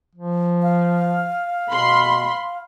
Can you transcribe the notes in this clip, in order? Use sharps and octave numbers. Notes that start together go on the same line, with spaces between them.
F3
F5
B2 B5 C6